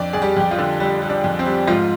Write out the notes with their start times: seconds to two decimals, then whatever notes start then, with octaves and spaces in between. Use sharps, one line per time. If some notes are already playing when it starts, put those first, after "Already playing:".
Already playing: F2 D4 D5
0.13 F2 G#4
0.22 G3 G4
0.37 F2 G4
0.51 F3 F4
0.58 D3
0.80 G3
1.02 G3
1.09 D4
1.24 F2
1.39 C4
1.46 G3
1.67 G#2 F3 F4